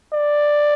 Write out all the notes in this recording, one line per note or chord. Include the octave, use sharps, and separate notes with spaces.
D5